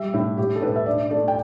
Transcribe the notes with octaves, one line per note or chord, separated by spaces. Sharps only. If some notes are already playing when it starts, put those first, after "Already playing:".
Already playing: G3 E5
A2 E4
A2 G4
A4
A2 B4
E5
D4 D5
A3 D5
G5